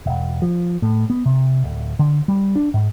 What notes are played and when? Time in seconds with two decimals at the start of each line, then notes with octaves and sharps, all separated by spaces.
0.06 E1
0.42 F3
0.82 A2
1.10 B3
1.26 C3
1.64 D1
1.99 D3
2.28 G3
2.56 D4
2.74 G#2